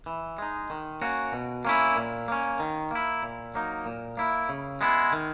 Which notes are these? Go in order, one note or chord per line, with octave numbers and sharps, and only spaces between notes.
E3
G#3 D#4
D#3
A#3 C#4 F#4
B2
A#3 C#4 E4
A#2
A#3 C#4
D#3
A#3 E4
A#2
F#3 A#3 D#4
A#2
A#3 E4
C#3
G#3 B3 E4
D#3